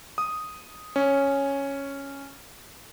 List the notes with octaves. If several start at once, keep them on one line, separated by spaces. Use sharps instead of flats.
D#6
C#4